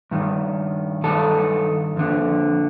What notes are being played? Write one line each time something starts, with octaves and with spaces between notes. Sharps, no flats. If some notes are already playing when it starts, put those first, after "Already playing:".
G2 D#3
G2 D#3 A4
F2 D3